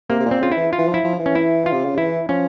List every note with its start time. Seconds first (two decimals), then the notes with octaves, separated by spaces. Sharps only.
0.10 C3 A#3
0.20 C3
0.26 A#2
0.31 C4
0.41 C#3 F4
0.52 E4
0.57 E3
0.73 F4
0.78 E3
0.88 F3
0.94 E4
1.04 F3
1.19 E3
1.26 C#4
1.35 E4
1.66 F4
1.72 C3
1.85 C#3
1.97 E3 E4
2.29 F3 C#4